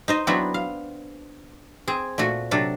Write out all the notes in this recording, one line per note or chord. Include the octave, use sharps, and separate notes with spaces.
D#4 C5 D#5
F#3 B3 C4 D4 E4 F#4
F5
C4 G#4
A#2 A3 F#4
C3 F#3 D4 A4